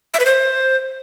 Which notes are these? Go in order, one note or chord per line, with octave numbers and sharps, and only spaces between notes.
E5
B4
C5